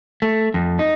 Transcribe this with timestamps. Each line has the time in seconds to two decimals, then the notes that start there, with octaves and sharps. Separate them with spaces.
0.22 A3
0.54 F2
0.79 D#4